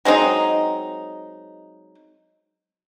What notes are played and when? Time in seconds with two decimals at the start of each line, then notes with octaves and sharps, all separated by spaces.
0.05 F#3 G#3 C4 D#4